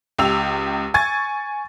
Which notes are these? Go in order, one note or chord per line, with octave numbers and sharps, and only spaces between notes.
C#2 G4 E6 F7
G#5 C#6 G#6 A6